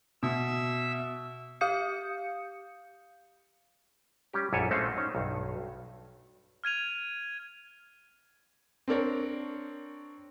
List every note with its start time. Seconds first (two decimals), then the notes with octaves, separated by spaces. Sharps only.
0.23 B2 E5 E6
1.61 G4 F5 D#6 G6 C#7
4.33 G3 C#4 G4
4.53 A#1 F#2 E4 A4 C#5 G#5
4.71 G#3 A3 C4 C#4 A4 F5
4.96 C#4 D#4
5.15 B1 G2
6.64 F6 G#6 D#7 F7
8.88 C4 D4 A#4 C#5